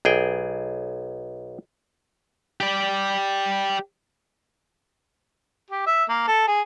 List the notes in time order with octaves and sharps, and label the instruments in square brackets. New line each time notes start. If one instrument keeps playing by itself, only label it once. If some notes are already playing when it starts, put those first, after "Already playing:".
[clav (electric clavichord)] B1 G#4 G5
[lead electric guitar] G4 D5
[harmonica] G4
E5
A#3
A4
G#4